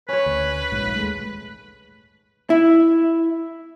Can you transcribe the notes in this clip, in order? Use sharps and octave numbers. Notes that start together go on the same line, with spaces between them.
C#4 B4 C#5
D2
A#1 G#2
D#2 G#3 A3
E4